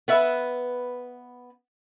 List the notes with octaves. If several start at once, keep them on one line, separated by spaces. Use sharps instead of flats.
B3 B4 E5